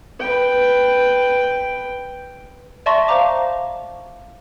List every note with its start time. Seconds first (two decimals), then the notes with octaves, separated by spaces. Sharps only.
0.20 B4 G5
2.86 D5 E5 A5 C6 C#6 A#6
3.08 C5 F5 A#5 D6